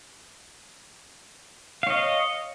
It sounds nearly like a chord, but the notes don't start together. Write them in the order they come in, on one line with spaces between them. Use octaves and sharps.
F5 C#5 D#5